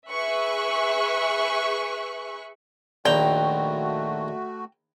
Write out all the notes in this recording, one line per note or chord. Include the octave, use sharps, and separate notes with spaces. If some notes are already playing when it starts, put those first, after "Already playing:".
G#4 B4 E5 C#6 F#6
A#1 D#2 A3 F#4 D5 G5 A#5